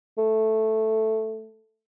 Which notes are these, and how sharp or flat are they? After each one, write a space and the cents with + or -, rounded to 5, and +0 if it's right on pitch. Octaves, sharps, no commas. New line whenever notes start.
A3 +0